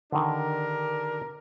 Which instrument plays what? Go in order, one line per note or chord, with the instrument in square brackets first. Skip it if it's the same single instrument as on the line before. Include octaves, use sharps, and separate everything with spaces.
[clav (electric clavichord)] D3 D#3 [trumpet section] D4 G4 A#4